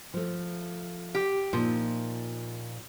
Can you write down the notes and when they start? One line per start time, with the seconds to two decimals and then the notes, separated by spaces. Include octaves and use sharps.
0.14 F3 A3
1.15 G4
1.53 A#2 F3 D#4